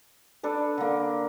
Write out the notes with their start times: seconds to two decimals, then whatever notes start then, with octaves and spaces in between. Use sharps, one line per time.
0.43 D4 A4 B4
0.78 D3 A#3